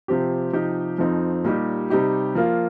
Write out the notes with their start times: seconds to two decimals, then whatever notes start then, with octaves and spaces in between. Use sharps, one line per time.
0.08 C3 F3 C4 G4
0.53 C3 F3 D#4 G4
0.98 F2 F3 C4 D#4
1.44 A#2 G3 D#4 G4
1.90 C3 G3 D#4 G4
2.35 F3 A#3 F4